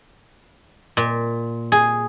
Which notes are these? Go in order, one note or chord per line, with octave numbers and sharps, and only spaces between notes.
A#2
G#4